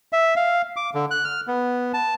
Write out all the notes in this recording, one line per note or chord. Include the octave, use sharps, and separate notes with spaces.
E5
F5
D6
D3
F#6
F6
B3
A5